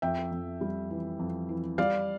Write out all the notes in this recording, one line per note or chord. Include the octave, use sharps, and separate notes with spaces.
F2 E5 G5
F2
G3
E3
F2
E3
G3 D5 F5